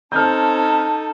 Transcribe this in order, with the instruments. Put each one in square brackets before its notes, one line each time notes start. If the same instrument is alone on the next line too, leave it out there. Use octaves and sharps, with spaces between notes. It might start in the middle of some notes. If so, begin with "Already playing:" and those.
[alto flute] C4 [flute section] C#4 A5 [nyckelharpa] D#4 A4 [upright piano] F6 G6